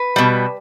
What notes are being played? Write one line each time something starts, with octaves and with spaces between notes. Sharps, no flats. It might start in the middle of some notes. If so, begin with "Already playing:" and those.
Already playing: B4
B2 G3